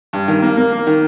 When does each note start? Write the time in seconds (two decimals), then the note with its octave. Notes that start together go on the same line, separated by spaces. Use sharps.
0.13 G2
0.28 D#3
0.42 A#3
0.57 A#3
0.72 A#3
0.87 D#3